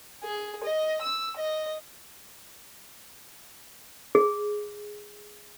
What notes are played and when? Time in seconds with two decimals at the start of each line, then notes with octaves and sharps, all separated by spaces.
0.24 G#4
0.63 D#5
1.01 E6
1.36 D#5
4.15 G#4